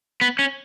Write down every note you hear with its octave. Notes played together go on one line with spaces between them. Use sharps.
B3
C#4